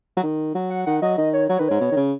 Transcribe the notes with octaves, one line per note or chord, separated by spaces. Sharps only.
F#3
D#3
F#3
F#5
D#3 F#5
F#3 D#5
D#3 D#5
C#5
F#3 C#5
D#3 B4
G#2 C#5
B2
D#3
C#3